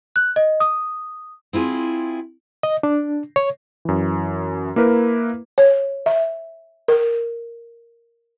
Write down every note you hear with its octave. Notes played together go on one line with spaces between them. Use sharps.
F#6
D#5
D#6
C4 E4 F4 G#4
D#5
D4
C#5
F#2 E3
A#3 E4 A#4 B4
C#5
E5
A#4